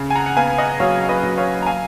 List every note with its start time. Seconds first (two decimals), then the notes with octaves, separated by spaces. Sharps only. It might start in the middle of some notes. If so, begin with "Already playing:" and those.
Already playing: C#3
0.10 G#5
0.15 F#5 A#5
0.26 F#5
0.36 B3 F5 G#5
0.58 D#5 F#5
0.80 F#3 C#5 F5
1.00 F5
1.09 B4 D#5
1.23 F#3
1.38 C#5 F5
1.62 A#5
1.66 F5 G#5